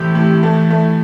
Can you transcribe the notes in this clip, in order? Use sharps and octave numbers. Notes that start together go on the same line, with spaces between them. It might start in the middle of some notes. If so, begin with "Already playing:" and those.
Already playing: A2 C3 E3 G4
A2
A3
A3